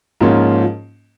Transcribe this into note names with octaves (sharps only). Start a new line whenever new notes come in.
G#2 F3 A#3 C#4 F4